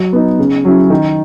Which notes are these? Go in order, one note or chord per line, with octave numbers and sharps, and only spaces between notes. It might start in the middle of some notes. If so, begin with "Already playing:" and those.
Already playing: F#3
B3 D#4
C#3
F#3 C#4 E4
D#3